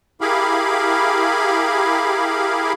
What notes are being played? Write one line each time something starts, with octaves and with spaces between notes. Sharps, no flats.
E4 G4 G#4 A#4 F5 B5